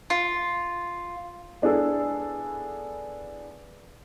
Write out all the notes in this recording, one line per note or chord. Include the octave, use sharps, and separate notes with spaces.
F4
B3 D4 E4 G#4 A4